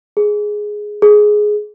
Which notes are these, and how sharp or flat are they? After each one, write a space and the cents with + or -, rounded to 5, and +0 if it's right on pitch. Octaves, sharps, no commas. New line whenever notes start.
G#4 +5
G#4 +10